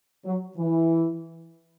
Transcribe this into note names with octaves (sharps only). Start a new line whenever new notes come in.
F#3
E3